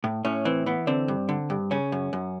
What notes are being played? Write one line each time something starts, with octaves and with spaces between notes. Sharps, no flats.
A2
A2 C#4
E3 C4
E3 B3
D3 C4
G2
D3
G2
C#3 C#4
F#2
F#2